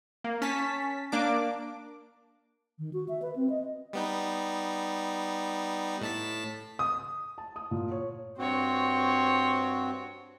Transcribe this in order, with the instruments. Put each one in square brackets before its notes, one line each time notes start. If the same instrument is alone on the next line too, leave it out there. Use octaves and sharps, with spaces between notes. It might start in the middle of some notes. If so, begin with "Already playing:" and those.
[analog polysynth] A#3
C#4 A5 B6
A#3 D4 D6
[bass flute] D#3
F#4
E5
B4
C4
D#5
[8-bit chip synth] G3 B3 D#4
A2 A5 B6
[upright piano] D#6
[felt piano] A5
D#6
A#2
C#5
[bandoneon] G2 C4 F#4 [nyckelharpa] C5 C#5